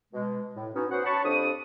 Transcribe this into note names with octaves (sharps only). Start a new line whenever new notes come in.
B2 G#3
A2
B3 C#4 D#4 F#4
B3 C#4 F#4 C5 F#5
C#5 A5 B5 C#6
F2 D4 G4 D#6